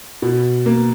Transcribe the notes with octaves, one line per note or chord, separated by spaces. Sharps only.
B2
A#3